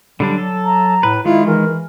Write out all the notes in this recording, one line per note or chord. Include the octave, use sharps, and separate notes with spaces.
D3 F#3 G3 D4
A4
A#5
A2 B4
D#3 G#3 E4 F4
E3 A#4